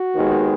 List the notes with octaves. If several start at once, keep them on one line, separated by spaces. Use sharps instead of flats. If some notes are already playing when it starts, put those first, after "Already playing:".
Already playing: F#4
D#2 D#3 G#3 B3